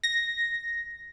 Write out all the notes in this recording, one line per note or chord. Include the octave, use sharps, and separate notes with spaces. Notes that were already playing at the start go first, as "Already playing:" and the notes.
A#6